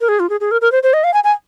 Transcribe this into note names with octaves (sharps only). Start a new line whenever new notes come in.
A#4
G#4
F4
G#4
G#4
A#4
A#4
C5
C5
D#5
F5
G#5
G#5